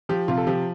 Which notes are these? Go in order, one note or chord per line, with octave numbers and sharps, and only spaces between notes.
F3 G4
C3 F4
A4
F3 G4